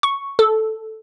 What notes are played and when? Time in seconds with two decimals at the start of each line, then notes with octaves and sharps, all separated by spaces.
0.03 C#6
0.39 A4